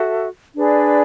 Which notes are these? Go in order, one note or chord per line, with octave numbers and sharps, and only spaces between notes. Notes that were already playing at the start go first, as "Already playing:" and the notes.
Already playing: F#4 A4 E5
D4 G#4 B4 D5